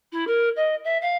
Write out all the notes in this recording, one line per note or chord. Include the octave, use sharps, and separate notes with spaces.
E4
A#4
D#5
E5
F5